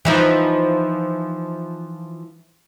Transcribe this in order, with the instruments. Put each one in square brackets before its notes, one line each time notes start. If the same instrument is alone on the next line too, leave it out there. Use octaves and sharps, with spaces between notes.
[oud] E3 F3 D#4